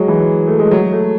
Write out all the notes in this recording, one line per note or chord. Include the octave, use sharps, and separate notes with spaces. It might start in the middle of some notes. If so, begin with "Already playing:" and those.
Already playing: F#3 G#3
E3
A3
G#3
F#3
A3